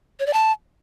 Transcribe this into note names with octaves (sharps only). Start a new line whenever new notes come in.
C#5
D5
A5